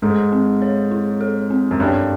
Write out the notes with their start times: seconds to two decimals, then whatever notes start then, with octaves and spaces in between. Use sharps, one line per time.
0.02 G#2 A4
0.32 C4
0.62 C#5
0.91 E4
1.21 A4
1.50 C4
1.71 F#2
1.80 G2 C#5